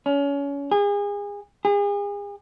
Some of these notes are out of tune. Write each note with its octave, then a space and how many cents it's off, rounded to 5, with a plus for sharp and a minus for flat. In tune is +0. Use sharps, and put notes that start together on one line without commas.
C#4 +30
G#4 -35
G#4 -40